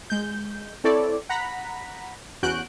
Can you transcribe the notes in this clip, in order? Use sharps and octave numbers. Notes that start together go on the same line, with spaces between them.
G#3 G6
C4 E4 A4 C#5 D5
F#5 A#5 B5 B6
E2 C#4 F#4 F#6 G6 D7